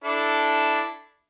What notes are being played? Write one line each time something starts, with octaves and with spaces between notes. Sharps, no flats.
D4 E4 A4